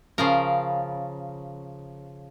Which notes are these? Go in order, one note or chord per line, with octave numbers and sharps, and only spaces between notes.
C#3 F3 A#4